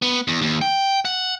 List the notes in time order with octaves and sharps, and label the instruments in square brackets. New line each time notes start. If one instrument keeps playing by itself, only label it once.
[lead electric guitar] B3
E2
D#2
G5
F#5